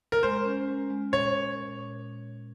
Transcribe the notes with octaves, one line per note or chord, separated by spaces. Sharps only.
A#4
G#3 C5
C#4
G#3
G#3
A#2 C#5
A#2
A#2
A#2